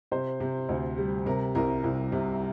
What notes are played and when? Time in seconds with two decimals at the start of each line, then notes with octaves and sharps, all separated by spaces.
0.12 C3 C5
0.40 C3
0.69 D2
0.98 G3
1.26 C3 A#4
1.55 C2 A#4
1.84 C2
2.12 C3